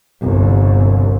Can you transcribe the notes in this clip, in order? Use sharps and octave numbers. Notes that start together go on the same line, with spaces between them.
G1 C2